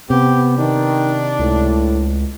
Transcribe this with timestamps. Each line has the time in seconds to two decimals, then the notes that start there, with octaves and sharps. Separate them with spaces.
0.10 C3 B3 G4
0.58 D#3 D4
1.39 C#2 A2